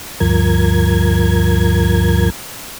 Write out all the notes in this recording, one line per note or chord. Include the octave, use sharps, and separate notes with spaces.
D2 G2 F3 A#4 G#6